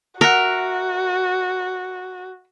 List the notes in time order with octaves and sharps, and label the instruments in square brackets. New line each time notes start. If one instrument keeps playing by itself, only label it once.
[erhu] F#4 [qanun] A#4 [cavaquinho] E5 F#5